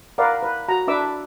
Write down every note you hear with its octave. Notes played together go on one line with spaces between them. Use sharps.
A#4 B4 D5 F5 F#5
B4
F#4 A#5
D4 B4 E5 D6 E6